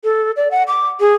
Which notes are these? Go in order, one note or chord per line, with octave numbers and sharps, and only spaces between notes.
A4
D5
F#5
D6
G#4